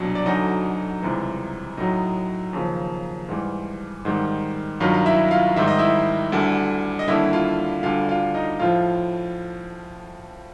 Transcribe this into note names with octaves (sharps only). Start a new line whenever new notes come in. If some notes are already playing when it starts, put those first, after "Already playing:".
Already playing: C2 B2 F#3 D4
D5
D2 D3 F#3 D#4 D#5
C#2 C3 E3 G3
A2 F#3 D#4 D#5
D#2 C#3 F3
G#2 E3 G3
G#2 D#3 G3
G2 D#3 F#3 F4 F5
F5
E4 E5
F4 F5
G#2 D#3 G3 E5
D#5
E4 E5
D2 D3 G3
D#5
D#2 D3 G3 E4 E5
F4 F5
D2 D3 G3 F4 F5
F4 F5
D#4 D#5
A2 F3 F4 F5